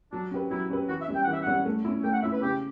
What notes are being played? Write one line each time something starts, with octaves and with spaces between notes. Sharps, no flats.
F#3 D4
C#4 G4 B4
F#3 E4
C#4 G4 B4
E3 F#4
E5
G3 C#4
G5
E3 F#5
E5
G3 C#4 F#5
A3
C#4 E4
A3 G5
F#5
C#4 E4 E5
B4
C#3 G4